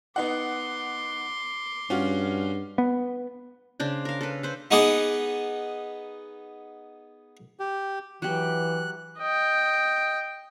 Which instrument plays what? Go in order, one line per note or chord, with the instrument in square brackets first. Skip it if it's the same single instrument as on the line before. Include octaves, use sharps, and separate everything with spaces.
[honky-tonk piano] B3 D#4 F#5 [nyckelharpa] C6 D6
[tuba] G2 [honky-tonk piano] C#4 F4 F#4
[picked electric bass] B3
[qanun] C#3 D4 C5
A#4 F5
A4 B4
B4 C5
[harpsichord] B3 D#4 G#4 F#5 D6 D#6
[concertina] G4
[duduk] E3 [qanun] F#3 G4 [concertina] F#6
[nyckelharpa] D#5 G5